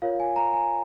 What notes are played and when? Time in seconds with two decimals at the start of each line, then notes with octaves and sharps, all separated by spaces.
0.02 F4 A#4 C#5 F5
0.20 G#5
0.36 A#5
0.53 G#5